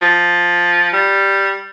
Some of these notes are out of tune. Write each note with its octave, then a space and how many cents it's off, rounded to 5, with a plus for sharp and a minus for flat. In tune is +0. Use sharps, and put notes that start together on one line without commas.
F3 +5
G3 +0